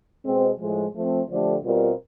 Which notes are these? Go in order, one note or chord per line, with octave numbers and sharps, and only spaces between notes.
B2 G#3 C4
A2 F3 G#3
F3 A3 C4
D3 F3 A3 D4 G4
B2 G3 C4 F4 A#4